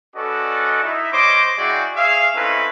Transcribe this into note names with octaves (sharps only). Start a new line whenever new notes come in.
C#4 F#4 A4 B4 D5 D#5
D#4 E4 E5
G3 C5 C#5 D#5 D6
G#3 E4 F#4 G#4 D5 G5
G#4 C#5 E5 F5
C4 C#4 D#4 E4 A4 B4